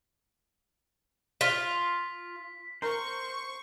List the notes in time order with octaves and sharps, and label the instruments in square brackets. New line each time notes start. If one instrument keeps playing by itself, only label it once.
[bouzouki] F4 [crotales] B6
[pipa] A#4 [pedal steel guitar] C5 [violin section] C#6